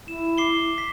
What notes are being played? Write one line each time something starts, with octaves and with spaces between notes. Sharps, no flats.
E4 E7
D6 C7 G7
B6